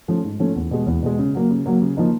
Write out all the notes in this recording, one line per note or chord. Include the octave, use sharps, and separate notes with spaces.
F3 A3 C#4
G#2
F3 A3 C#4
E2
B2 G#3
E2
B2 G#3
C#3
F#3 A#3
C#3
F#3 A#3
C#3
F3 A#3 D#4